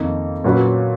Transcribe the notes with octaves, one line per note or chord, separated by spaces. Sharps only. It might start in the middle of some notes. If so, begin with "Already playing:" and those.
Already playing: F2 D#3 A#3 D#4
A#2 F#3 C#4 F#4 B4